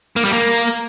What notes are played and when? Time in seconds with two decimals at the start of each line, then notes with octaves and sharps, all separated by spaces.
0.16 A#3
0.25 G3
0.33 A#3